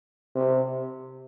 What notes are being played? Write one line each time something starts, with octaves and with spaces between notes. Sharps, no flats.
C3